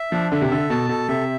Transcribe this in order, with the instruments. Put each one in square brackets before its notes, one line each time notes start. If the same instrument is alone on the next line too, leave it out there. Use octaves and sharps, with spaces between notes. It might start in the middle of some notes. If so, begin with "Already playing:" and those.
Already playing: [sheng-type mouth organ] E5
[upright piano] F3 [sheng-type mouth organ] D4
[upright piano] D3 [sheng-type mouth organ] E5
[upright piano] C3
[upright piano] D3 [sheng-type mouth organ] A4
[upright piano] B2 [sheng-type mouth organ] A5
[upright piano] B2 [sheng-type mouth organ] A4
[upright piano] C3 [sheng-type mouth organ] E5